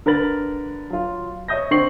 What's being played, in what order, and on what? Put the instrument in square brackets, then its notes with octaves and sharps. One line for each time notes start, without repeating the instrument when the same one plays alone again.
[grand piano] D3 A#4 B4 B5 A6 F#7
F#3 F4
C#5 D#5 E5 D#6 G6 A#6
D3 C4 C#6 C7 F#7